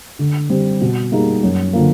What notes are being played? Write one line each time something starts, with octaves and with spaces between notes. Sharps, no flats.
D3
G3 C4
B2
G3 A#3 D#4 G#4
F#2
D3 F3 A#3